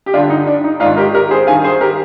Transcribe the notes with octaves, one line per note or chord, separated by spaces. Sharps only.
G4
G2 D3 D4 F4
D#4
D4
D#4
G#2 D#3 D4 F4
G4 A#4
G4 A#4
G#4 C5
G2 D#3 F5 G#5
G#4 C5
G4 A#4